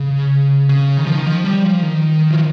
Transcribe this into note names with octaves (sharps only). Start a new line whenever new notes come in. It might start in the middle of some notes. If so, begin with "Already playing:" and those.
Already playing: C#3
C#3
D#3
F3
D#3
F3
G3
F3
D#3
F3